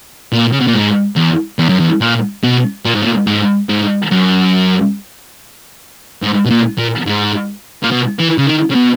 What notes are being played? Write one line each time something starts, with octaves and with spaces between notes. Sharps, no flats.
A#2
C#3
B2
A#2
G#2
E2
E2
F#2
E2
A#2
B2
A#2
G#2
A#2
G#2
G#2
F#2
G#2
B2
A#2
A#2
G#2
A#2
B2
E3
C#3
D#3
C#3
B2